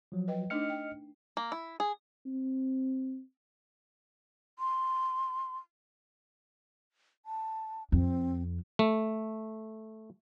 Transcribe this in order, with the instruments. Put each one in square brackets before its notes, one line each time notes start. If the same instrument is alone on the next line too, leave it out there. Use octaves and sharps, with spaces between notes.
[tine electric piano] F3 F#3
[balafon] B4 D#5 G5
[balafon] A3 D4 D#4 [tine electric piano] D#5 F6 C#7
[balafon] G5
[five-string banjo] A#3
E4
G#4
[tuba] C4
[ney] C6
[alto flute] A5
[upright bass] F2 [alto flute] C4
[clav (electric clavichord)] A3